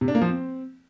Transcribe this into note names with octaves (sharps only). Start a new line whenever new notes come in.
C3
D4
A#3
F3
C4